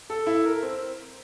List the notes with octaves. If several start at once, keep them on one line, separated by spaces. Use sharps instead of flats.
A4
E4
A#4
C4